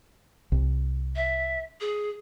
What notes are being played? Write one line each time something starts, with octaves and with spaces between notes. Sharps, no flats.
C2
E5
G#4